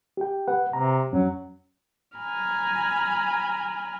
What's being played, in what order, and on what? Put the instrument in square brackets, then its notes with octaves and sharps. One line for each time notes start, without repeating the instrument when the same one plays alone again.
[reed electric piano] G4 G5
B4 F#5
[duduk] C3 [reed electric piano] A#5
[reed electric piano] F2 C#4 [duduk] F#3
[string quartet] G#5 A#5 B5 F6